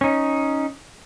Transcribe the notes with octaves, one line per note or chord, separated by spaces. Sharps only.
C#4 D#4